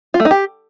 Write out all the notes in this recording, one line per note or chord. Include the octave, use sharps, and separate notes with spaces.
F4
A3
D#4
G4